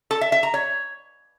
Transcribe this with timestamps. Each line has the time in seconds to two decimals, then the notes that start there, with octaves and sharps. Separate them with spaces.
0.11 A4
0.21 E5
0.32 E5
0.43 A#5
0.54 C#5